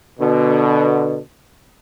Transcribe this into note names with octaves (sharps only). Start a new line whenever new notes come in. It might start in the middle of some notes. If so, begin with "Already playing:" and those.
B2 D3